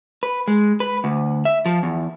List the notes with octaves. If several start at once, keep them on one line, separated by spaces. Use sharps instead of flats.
B4
G#3
B4
D2
E5
F3
E2